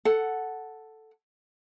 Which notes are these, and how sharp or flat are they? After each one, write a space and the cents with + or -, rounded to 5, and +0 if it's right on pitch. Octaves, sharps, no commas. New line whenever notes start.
A4 +0 F#5 +0